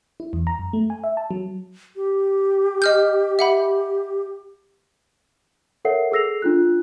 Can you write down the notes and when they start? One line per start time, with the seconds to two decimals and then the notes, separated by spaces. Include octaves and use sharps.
0.20 E4
0.33 E2
0.47 A#5
0.59 F#2
0.73 A3
0.90 G#5
1.04 E5
1.17 A5
1.31 F#3
1.96 G4
2.82 D#5 F6 G6
3.39 E5 F#5 B5
5.85 A4 A#4 C#5 E5 F#5 C7
6.12 G#4 A4 E6 A#6 C7 F7
6.42 D4 F4 F#6